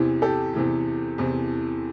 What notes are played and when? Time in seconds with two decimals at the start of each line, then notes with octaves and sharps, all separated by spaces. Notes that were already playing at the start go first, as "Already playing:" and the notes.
Already playing: E2 C3 E3
0.22 G4 A4
0.54 E2 C3 E3
1.18 E2 C3 E3